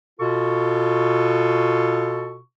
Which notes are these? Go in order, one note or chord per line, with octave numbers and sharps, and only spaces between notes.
B2 F4 A4 C#6